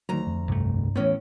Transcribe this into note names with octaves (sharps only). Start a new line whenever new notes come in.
D2 D#3 F#3 A#5
F2
C2 G2 A3
A2 E3 B3 C#4